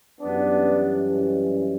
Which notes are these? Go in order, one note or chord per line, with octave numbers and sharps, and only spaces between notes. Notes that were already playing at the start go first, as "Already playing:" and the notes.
F#2 E3 G3 B3 D4